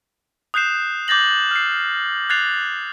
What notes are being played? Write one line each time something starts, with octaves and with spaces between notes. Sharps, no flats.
D#6 F#6 G6 C7 E7
D6 G6 A6 A#6 F#7
F6 C7
F#6 G#6 A6 C7 F7